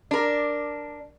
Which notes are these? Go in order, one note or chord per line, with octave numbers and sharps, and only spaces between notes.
D4 A#4